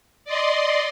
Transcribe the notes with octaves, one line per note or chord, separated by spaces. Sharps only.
D5 D#5 C6